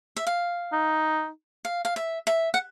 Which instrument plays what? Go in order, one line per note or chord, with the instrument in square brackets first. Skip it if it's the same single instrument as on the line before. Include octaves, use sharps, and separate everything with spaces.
[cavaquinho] E5
F5
[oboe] D#4
[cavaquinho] F5
F5
E5
E5
F#5